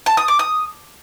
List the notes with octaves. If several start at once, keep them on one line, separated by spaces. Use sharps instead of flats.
A5
D#6
D6
D#6